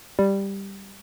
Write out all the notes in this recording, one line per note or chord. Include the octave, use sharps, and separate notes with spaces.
G3